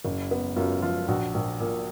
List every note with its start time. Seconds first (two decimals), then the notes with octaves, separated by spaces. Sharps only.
0.05 F#1
0.31 B3
0.56 F#2 F4
0.82 F3 F4
1.08 A#1 F#4
1.35 A#1
1.60 A#2